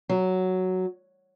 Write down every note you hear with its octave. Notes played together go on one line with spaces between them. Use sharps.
F#3